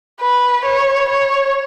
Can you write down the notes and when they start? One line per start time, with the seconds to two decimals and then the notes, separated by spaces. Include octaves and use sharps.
0.21 B4
0.65 C#5
1.09 C#5